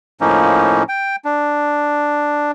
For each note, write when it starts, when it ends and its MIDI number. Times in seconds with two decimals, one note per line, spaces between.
0.21 0.83 45
0.21 0.83 53
0.21 0.83 58
0.21 0.83 61
0.21 0.83 63
0.89 1.16 79
1.25 2.51 62